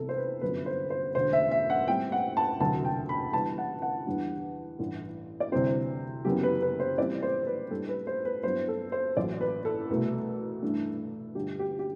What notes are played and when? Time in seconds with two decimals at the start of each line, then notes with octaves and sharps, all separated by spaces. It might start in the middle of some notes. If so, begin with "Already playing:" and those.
Already playing: C2 C3 E3 B3 A4
0.09 C5
0.18 B4
0.41 G1 F#2 F#3 B3 B4
0.66 C5
0.90 C5
1.15 E1 D2 D3 C5
1.33 E5
1.51 E5
1.70 F#5
1.88 A2 G3 C4 E4 G5
2.12 F#5
2.37 A5
2.60 E1 D2 C3 F#3 A5
2.85 G5
3.09 B5
3.33 E2 D3 G3 A5
3.58 F#5
3.82 F#5
4.07 E2 D3 G3 D4
4.79 A1 G2 E3
5.40 D5
5.52 D2 C3 E3 G3 C4 C5
6.25 F#1 F#2 E3 B3 G4
6.43 B4
6.62 B4
6.80 C5
6.98 A2 E3 G3 C4 D5
7.22 C5
7.47 B4
7.70 A2 G3 D4 A4
7.89 B4
8.07 C5
8.25 B4
8.43 G2 F#3 B3 E4 C5
8.68 A4
8.92 C5
9.17 A1 A2 F#3 D5
9.41 B4
9.65 A4
9.89 C2 B2 A3
10.62 G2 E3 A3 D4
11.35 G1 G2 D3 G4
11.59 G4
11.79 G4